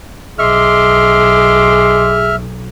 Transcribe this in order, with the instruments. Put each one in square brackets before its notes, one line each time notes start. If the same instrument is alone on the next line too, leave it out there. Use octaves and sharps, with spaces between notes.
[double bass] B1 [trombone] G#4 [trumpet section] D#5 C6 D6 [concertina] E5 F6